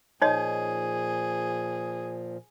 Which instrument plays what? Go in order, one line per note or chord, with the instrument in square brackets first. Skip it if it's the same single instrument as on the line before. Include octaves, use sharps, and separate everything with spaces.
[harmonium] A#2 F3 [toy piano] D#4 C#5 D#5 [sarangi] G#4